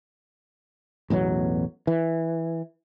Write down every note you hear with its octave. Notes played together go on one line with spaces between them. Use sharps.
A1 E2 B2 F#3
E3